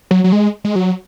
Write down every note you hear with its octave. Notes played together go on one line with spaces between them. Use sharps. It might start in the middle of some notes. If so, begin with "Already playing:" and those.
F#3
F#3
G#3
G#3
F#3